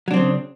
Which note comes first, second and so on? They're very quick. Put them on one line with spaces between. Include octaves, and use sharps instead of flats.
F#3 D4 C4 C#3